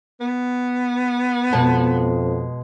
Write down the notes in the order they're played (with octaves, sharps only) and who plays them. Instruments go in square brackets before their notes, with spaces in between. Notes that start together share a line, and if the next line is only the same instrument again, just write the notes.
[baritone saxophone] B3
[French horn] F2 [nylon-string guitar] B2 G#3 A5